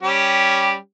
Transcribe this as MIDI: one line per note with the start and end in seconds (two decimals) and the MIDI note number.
0.03 0.76 55
0.03 0.76 61
0.03 0.76 67